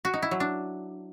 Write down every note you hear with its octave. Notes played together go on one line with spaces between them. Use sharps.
F#4
D#4
E4
F#3
D4